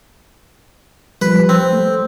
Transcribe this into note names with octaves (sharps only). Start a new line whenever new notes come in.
F3 G3 B4
C4
A3